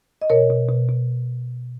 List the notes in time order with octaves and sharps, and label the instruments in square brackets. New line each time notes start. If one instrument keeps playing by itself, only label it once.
[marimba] D#5
B2 A#4 C#5
B2
B2
B2